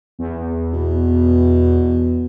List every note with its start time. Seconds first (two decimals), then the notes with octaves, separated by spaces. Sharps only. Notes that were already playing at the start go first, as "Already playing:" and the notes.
0.19 E2
0.74 B2